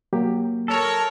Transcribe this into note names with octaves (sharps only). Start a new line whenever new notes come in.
F#3 A#3 G4
A4 A#4 C#5